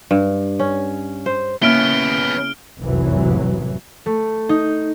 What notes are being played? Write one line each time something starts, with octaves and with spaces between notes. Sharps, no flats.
G2
C#4
C5
C#3 A#3 B3 C#4 E4 F6 D7 G7
F1 C2 F#2 A2 E3 F#3
A3
D#4